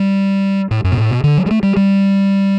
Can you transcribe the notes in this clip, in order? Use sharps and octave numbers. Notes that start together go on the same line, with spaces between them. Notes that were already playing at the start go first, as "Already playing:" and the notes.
Already playing: G3
A2
F#2
B2
A2
B2
D3
F#3
G3
A3
G3
G3